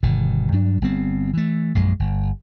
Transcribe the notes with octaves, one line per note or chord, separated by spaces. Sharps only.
G1 B2 D#3
G2 F#3 D4
G1 G3 B3 C4
E3 A3
A#1 F#2 G#3
G1